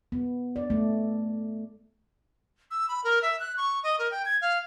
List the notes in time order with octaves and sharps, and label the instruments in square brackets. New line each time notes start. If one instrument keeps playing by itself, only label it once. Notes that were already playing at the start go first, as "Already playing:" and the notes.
[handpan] B3
D5
A3
[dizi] E6
B5
A#4
E5
F#6
C#6
D#5
A#4
G5
G#6
F5